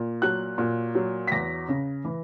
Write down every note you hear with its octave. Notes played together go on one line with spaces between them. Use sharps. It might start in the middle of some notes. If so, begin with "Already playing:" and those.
Already playing: A#2
F#3 F#6
A#2
F#3
B6
E2 A#6
C#3
E3